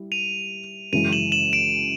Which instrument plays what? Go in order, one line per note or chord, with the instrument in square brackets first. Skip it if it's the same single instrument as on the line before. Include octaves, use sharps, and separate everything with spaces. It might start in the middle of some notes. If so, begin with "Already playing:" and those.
Already playing: [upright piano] G3 E4
[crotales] D#7 F7
[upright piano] F#2 C#3 E3 G#3 [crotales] D#7 F7
[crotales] E7 F#7
E7 F#7
D7 E7